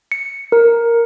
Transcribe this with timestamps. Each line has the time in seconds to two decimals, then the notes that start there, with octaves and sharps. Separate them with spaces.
0.12 C#7
0.52 A#4